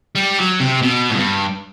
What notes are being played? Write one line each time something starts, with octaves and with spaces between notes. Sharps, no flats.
G3
F#3
C3
B2
A2
G2